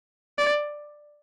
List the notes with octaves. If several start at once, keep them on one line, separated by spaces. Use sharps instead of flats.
D5